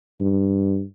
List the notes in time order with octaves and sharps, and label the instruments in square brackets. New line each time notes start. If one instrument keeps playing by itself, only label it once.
[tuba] G2